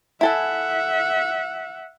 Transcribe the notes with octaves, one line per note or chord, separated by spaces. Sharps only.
E4 A4 E5 F#5 G#5